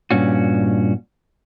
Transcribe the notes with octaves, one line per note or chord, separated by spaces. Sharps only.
G2 A#2 C#4 F#4